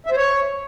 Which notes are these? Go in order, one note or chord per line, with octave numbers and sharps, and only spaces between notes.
E5
C5
C#5